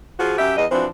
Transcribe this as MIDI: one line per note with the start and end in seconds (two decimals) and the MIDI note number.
0.20 0.36 53
0.20 0.36 65
0.20 0.36 66
0.20 0.36 68
0.38 0.55 42
0.38 0.55 67
0.38 0.55 76
0.56 0.66 40
0.56 0.66 75
0.71 0.86 52
0.71 0.86 53
0.71 0.86 60
0.71 0.86 62
0.71 0.86 66